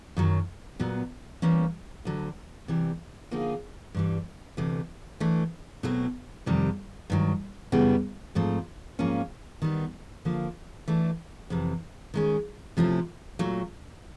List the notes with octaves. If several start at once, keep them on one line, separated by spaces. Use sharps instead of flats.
F#2 D#3 F#3
A#2 F#3 B3
E3 G3 A#3 C#4
D2 D3 F#3
C3 E3 G3
D3 F3 A#3 D#4 G#4
G2 E3 G3
D2 C3 E3 A3
E3 A3 D4
B2 F#3 A3 C4 E4
F2 C3 D#3 G3
G2 D#3 F#3
F#2 C#3 E3 G3 B3
G#2 F3 A3 C4
G#2 F3 A#3 C#4
D#3 G3 B3
D3 F3 A#3
E3 A3 D4
F2 C3 E3
D#3 G#3 C#4
C3 F3 A3 C#4 E4
A#2 F#3 A3